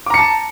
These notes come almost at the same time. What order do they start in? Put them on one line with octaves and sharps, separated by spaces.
D6 A#5 C#7 A5